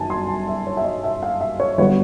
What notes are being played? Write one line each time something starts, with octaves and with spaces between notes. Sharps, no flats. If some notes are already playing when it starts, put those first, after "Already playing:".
Already playing: G1 F#2 D#3 G#5 A5
C6
A5
E5
C#5
E5
D#5
E5
F5
E5
C#5
G1 G2 D3 F#3 B3 C#5